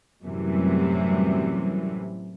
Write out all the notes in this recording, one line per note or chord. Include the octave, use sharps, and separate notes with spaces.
F#2 A2 C3 E3 F#3 G3